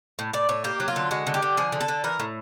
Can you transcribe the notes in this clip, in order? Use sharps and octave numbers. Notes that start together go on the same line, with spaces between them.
A2
A2 D5
A2 C#5
A#3 G4
F#3
F4
D3
G#3 F#4
D3
G4
D3
F3 G#4
D3
A4
D3
E3 A#4
A2